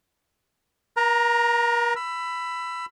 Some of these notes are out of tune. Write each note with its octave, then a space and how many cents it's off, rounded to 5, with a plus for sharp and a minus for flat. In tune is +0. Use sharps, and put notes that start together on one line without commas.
A#4 +40 A#5 +0
B5 +10 E6 +25